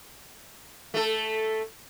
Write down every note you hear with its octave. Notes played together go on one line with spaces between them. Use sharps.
A3 A4